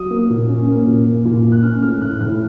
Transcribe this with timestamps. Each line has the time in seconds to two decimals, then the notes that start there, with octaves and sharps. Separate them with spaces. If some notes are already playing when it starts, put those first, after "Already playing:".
Already playing: F#3 D#6
0.11 A#3
0.30 A#2
0.49 C#4
0.68 A#3
0.87 A#2
1.06 A#3
1.25 A#2
1.45 A#3
1.52 F#6
1.63 C#4 F6
1.82 A3 F6
2.01 A2 F#6
2.21 A2 F6